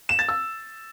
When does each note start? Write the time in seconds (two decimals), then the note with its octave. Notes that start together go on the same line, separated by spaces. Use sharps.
0.09 E7
0.19 A6
0.29 E6